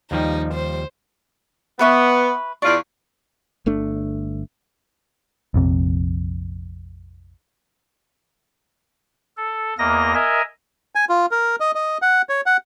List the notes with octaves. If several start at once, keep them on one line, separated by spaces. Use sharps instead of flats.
D#2 F3 G3 D#4
C5
B3 B4 E5 C#6
E2 F4 D5 C#6
G1 A3 D4
A#1 F2 C3
A4
E2 A#3 A#4 D#5 A#6
A#4 D#5 E5 G#5
G#5
F4
A#4
D#5
D#5
F#5
C#5
F#5